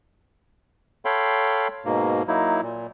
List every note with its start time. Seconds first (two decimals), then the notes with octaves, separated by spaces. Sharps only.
1.05 A4 C#5 F5 G5 B5 C6
1.85 G#2 B2 A#3
2.28 F#3 A#3 D#4 E4
2.62 A#2